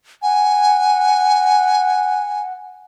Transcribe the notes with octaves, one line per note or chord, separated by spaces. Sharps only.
F#5 G#5